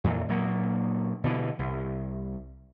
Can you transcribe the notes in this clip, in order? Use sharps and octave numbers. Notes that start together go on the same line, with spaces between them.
F2 A#2 E3
A#2 F#3 A#3
B2 D3 E3
C2